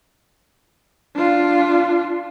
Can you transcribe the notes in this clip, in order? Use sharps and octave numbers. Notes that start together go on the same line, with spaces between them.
D4 F4